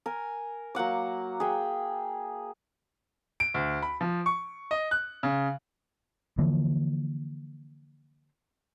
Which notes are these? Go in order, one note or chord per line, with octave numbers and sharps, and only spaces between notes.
A#4 G#5
F#3 A#3 F#5 D6
G#4 E5 G5
D7
D2
B5
F3
C#6
D#5
F#6
C#3
D3 E3 F3 A#3